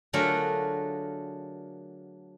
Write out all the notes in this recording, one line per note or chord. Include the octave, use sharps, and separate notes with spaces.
D3 F#3 A3 F4 G#4 A#4